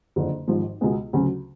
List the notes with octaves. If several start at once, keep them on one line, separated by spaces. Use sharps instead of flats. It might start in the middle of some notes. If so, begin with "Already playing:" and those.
F#1 F2 D3
G#1 G#2 F3
C#2 B2 G#3 B3
D2 C#3 F#3 C#4